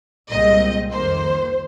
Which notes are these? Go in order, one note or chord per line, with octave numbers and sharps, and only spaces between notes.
C2 A#2 G#3 C4 D#5
F2 D#3 A#3 C5